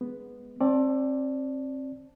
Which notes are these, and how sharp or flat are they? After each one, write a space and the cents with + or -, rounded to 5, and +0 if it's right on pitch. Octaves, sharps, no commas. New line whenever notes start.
G#3 +0 B3 +0
C4 +30 D5 +0 A5 +0